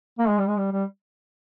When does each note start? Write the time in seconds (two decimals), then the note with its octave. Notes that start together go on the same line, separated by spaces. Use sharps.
0.19 A#3
0.29 G#3
0.38 G3
0.48 G#3
0.58 G3
0.72 G3